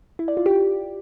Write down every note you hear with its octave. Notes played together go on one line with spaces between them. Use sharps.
E4
D5
F4
G4